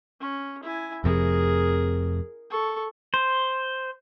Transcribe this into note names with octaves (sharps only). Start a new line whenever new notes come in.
C#4
E4 G#5
F1 F2 C3 G#4 A#4
A4 C#6
C5